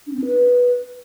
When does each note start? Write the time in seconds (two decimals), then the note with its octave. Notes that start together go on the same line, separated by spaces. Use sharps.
0.07 D4
0.13 C4
0.19 D4
0.26 B4